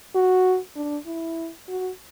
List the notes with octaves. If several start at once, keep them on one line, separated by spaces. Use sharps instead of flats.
F#4
D4
E4
F#4